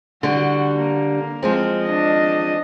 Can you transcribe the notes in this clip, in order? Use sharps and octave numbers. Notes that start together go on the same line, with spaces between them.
D3 G3 F#4
A#3
F3 G#3 C4
D4 D#5